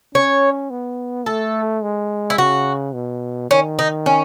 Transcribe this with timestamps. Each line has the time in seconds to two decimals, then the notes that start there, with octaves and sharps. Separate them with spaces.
0.15 C#4 C#5
0.70 B3
1.26 A3 A4
1.83 G#3
2.30 E4
2.38 C#3 F#4
2.94 B2
3.50 D#3 C#4
3.79 D#4
4.06 C#4